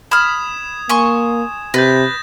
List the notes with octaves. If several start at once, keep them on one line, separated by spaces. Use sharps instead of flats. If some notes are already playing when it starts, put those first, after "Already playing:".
B5 D#6 F6 G#6 E7
A#3 G#5 C6 C#6
C3 B4 G6 A6 A#6